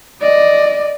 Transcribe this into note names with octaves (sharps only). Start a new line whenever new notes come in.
D5 D#5